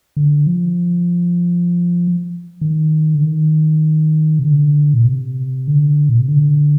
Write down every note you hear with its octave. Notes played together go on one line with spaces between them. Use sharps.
D3
F3
D#3
D3
D#3
C3
D3
A#2
C3
D3
A#2
C3
D3